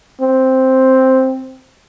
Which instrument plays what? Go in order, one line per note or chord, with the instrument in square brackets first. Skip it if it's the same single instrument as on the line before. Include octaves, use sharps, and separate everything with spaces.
[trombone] C4